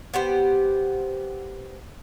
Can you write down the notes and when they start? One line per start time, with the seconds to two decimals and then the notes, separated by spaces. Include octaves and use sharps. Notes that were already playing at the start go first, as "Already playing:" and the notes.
0.14 B3 G4 C5